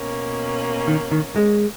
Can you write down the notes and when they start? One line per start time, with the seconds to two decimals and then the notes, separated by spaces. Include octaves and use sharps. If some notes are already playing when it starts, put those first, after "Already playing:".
Already playing: B2 A#3 C#4
0.87 D#3
1.11 D#3
1.36 G#3